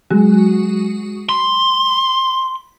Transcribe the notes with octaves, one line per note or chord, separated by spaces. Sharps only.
F#3 G#3 F#4
B5 C6